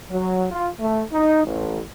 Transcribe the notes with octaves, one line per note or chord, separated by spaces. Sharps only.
F#3
F4
A3
D#4
A1